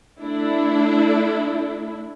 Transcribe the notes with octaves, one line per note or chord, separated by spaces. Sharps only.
A3 D4 E4